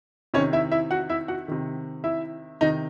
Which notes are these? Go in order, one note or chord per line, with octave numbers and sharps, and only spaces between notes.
C3 D#3 C#4 C#5
E4 E5
E4 E5
F#4 F#5
E4 E5
F#4 F#5
C3 D#3
E4 E5
C3 D#3 D#4 D#5